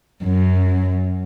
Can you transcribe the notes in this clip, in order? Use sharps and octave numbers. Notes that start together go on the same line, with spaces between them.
F#2